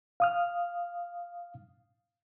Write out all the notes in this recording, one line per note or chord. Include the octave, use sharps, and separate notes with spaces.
F5 D#6 F6